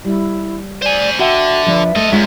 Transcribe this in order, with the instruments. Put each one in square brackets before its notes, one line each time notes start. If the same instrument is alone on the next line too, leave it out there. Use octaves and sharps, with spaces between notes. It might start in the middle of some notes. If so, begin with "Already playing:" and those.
[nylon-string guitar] G3 [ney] E4
[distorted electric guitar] C5 G#5 [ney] D5
[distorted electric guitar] D3 [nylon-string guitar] F#4 F#5 G5 [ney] E5
[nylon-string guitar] F3 D4 B4
[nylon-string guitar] A3 [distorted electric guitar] A4 D#5
[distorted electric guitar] F#2 [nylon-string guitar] G#3 D4 F4